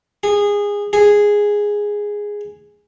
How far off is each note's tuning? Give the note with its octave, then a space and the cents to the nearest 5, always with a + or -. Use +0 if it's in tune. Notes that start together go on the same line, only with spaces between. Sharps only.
G#4 -20
G#4 -5